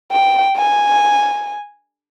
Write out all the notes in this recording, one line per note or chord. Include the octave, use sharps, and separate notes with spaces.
G5
G#5